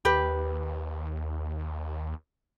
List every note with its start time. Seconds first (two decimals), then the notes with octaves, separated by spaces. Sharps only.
0.05 D#2 G4 B4